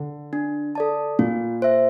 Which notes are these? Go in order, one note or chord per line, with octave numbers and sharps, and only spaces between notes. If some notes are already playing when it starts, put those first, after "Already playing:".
Already playing: D3
D4
A4 D5 A5
A#2 F4
C5 E5